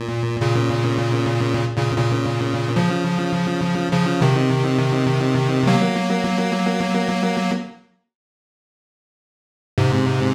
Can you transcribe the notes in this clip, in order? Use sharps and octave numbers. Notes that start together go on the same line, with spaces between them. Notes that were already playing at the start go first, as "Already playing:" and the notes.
Already playing: A#2
A#2 C#3
A#2 C#3
A#2 C#3
C#3 F3
C#3 F3
C3 D#3
F#3 A#3
G#2 C3